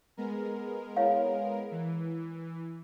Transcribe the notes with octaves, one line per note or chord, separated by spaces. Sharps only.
G#3 B3 A#4
E4 C#5 F5
E3